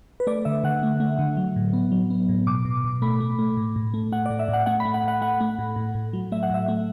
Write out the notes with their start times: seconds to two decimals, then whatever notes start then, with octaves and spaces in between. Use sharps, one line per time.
0.20 B4
0.27 A3 D5
0.45 D3 E5
0.64 D3 F#5
0.83 A3
1.00 A3
1.19 D3
1.37 F#3
1.56 A2
1.73 B3
1.92 F#3
2.10 B3
2.29 A2
2.47 B2 D6
2.65 B2
2.84 B2
3.02 A3 B5
3.20 A3
3.39 A3
3.57 A2
3.76 A2
3.94 A3
4.12 A3 F#5
4.26 D5
4.30 A2
4.39 E5
4.48 A2
4.53 F#5
4.66 A3 F#5
4.80 B5
4.85 A3
4.94 F#5
5.04 A2 F#5
5.22 A3 F#5
5.41 A3
5.59 A2
5.76 A2
5.95 A2
6.13 F#3
6.32 A3 E5
6.43 F#5
6.50 A2 E5
6.68 A3